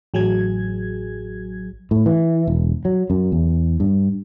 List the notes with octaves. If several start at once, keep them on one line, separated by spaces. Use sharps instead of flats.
A1 F#3 G#4 G#6
A2
E3
E1
F#3
F#2
E2
G2